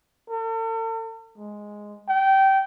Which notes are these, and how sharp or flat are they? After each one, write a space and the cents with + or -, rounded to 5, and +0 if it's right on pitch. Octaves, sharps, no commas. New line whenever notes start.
A4 +45
G#3 +0
G5 -20